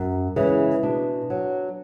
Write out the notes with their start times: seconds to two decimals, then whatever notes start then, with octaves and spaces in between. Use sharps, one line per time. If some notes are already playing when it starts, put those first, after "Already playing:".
Already playing: F#2
0.36 C#3 E3 G#3
0.83 B2 D4
1.30 F#3